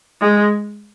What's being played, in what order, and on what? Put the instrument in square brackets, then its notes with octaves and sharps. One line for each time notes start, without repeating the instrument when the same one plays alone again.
[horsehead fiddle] G#3